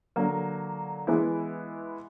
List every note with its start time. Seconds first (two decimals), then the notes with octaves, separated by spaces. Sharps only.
0.16 D3 F#3 A#3
1.07 E3 G#3 B3 E4